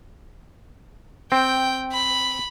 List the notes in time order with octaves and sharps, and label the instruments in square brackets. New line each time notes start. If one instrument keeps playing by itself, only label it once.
[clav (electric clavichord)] C4 [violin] G5
[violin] B5